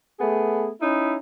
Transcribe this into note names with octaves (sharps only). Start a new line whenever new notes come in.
A3 B3 G#4
C#4 D#4 E4